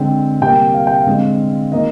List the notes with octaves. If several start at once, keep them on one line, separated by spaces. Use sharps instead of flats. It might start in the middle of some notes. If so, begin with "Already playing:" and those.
Already playing: D3 G#3 C4 G5
C3 G3 A#3 G5
F5
G5
F5
D3 G#3 C4
D#3 A#3 D#5